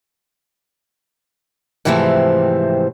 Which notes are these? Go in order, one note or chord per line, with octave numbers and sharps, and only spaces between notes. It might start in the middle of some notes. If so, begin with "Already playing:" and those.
G#2 C3 E3 F3 A3 C4